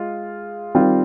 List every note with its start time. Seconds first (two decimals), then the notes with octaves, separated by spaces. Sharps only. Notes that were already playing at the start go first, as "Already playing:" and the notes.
Already playing: G#3 F4
0.75 D#3 G3 C4 F4